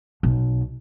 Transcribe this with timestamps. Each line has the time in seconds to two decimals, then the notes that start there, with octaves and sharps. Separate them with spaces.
0.23 B1